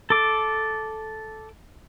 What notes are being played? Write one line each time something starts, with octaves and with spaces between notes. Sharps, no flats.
A4 D6